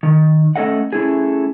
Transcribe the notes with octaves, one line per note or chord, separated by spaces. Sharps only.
D#3
A3 C#4 A4 D#5 F#5
A3 C#4 E4 G#4